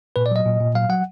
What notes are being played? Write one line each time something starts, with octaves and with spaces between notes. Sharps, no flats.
A#2 B4
D5
F#3 D#5
A#2
A#2
F#3 F5
F#3 F#5